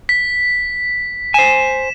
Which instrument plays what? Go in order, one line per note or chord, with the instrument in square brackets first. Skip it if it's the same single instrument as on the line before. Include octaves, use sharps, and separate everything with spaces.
[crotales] B6
[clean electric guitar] C5 G#5 [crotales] E7